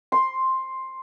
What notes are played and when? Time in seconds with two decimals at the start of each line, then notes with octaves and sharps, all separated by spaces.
0.12 C6